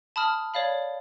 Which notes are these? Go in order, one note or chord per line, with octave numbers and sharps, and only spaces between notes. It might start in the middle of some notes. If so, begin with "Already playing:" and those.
A5 B5 D#6 F6
C#5 D5 F5 B5